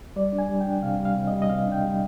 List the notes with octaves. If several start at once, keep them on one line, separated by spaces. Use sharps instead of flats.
G3 D5
D4
G#5
G3
G5
D4
C3 F5
G3
F5
C3
D#5
G3
D#5
C3 F5
D4
G5
G3